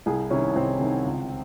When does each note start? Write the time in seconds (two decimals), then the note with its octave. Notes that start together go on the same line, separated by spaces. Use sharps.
0.06 C2 E4 G#4
0.30 C3 D#3 C#4 E4
0.56 C2 C4 D#4
0.80 C3 D#3
1.05 C#2